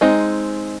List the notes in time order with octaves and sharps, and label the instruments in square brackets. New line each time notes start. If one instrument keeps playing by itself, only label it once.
[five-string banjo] G#3 C4 D#4 A#5